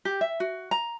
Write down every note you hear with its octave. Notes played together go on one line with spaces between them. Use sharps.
G4
E5
F#4
A#5